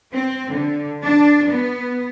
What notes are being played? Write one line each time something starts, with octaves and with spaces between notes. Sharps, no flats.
C4
D3
D4
B3